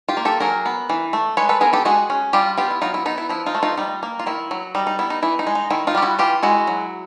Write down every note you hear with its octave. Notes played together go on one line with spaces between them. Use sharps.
F4 G4
A#3
G4 A4
F#3 G#4 A#4
B3
E3
A3
G#3 B4 C#5
A4 B4
B3 G#4 A#4
G4 A4
G#3 F#4 G#4
C#4
G3 F4 G4
B3 F4 G4
E4
F#3 D#4 F4
E4
B3 D#4
E4
F3 E4
D#4 F4
A3
D#4 F4
G3 D#4
A#3
F4
D#3 E4
F#3
G3 D#4
D#4
B3 E4
D#4
E3 E4
D#4
G#3
D#4
D#3 E4
D#4 F4
G3 G4
E4 F#4
E3 F4 G4
G#3 E4 F#4
F#3